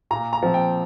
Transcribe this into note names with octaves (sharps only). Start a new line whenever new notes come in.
A#2 A#5
A#5
F3 C4
G5